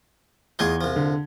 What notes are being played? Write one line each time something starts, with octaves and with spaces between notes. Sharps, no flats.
E2 D#4 F4 G#4 G#6 G7
C2 F3
D3